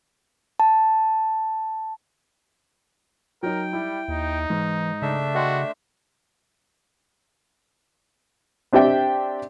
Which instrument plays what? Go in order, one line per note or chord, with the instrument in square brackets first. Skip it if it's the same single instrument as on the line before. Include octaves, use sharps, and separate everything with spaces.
[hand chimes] A5
[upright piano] F#3 D#4 [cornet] A#4 [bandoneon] G5
[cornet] G3 [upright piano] E4
[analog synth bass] D#2 [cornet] D#4
[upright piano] G#2 [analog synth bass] E3
[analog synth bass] C#3 [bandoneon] A3 D4 E5
[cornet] F#4 [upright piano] D#5 G5 C6
[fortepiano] C4 D4 G4 E5 G5